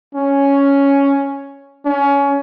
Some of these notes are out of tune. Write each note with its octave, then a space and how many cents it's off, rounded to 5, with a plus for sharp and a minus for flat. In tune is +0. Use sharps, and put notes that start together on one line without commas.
C#4 +5
C#4 +20